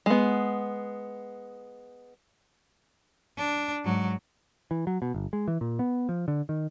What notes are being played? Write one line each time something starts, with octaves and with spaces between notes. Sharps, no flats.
G#3 B3
D4
G#2 F#3
E3
F#3
B2
G1
G#3
E3
A#2
B3
F3
D3
D#3